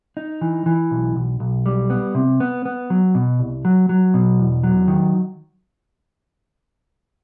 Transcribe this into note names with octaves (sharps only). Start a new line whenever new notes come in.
D#4
E3
E3
B1
B1
B1
G3
B3
C3
B3
B3
F#3
B2
C2
F#3
F#3
B2
E2
F#3
D#3